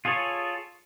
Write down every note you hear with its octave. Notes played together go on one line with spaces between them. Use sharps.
F4 G#4 A4 C#5